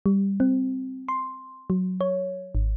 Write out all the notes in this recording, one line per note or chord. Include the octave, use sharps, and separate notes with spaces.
G3
C4
C6
F#3
C#5
G#1